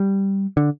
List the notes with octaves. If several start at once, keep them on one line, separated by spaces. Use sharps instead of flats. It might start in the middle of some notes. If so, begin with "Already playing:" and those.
Already playing: G3
D3